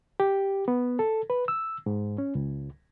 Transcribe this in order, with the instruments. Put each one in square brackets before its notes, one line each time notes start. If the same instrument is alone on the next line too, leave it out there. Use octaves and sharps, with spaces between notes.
[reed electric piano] G4
B3
A4
B4
E6
G#2
C#4
C#2